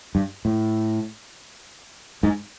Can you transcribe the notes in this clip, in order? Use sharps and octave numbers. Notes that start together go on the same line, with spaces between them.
G2
A2
G#2